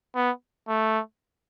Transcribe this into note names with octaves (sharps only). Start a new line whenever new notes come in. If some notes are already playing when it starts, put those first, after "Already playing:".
B3
A3